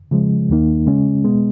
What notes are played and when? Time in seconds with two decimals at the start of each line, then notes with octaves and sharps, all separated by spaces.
0.11 C#3 F3 G#3
0.50 D#2 D#3 A#3 D#4
0.87 C#3 G#3 C#4
1.24 B2 G#3 B3